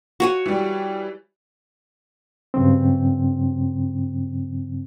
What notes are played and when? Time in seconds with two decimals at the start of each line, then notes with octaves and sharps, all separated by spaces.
0.20 F#4 C#5 G#5
0.46 E3 G3
2.54 G2 C#3 F#3 C4